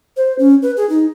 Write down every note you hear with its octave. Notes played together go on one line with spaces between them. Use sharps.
C5
C#4
B4
G#4
D#4